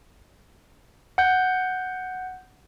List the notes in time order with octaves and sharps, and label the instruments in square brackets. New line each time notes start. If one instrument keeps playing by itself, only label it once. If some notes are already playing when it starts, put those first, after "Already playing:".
[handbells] F#5 G6